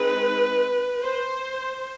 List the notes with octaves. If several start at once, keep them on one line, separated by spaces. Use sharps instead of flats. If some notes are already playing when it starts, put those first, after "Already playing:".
Already playing: G#3 C4 D#4 B4
C5